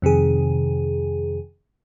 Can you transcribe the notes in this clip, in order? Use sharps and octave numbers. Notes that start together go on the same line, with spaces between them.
F2 C3 D#3 G#4